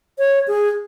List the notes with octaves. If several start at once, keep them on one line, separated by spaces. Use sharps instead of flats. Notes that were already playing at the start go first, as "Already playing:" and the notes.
C#5
G#4